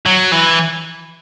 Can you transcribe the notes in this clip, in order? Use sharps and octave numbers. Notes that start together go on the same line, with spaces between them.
F#3
E3